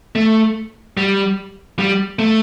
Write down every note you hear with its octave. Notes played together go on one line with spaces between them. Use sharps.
A3
G3
G3
A3